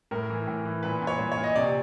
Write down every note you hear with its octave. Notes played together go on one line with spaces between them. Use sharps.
A2 A#4
E3
A2
E3
A#2 B4
A#2
C#5
A#2
C#5
A#2
D#5
C3 D5